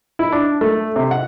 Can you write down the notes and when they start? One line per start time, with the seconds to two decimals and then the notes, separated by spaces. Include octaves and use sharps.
0.19 E4
0.32 D4
0.61 A3
0.96 C3
1.11 F#5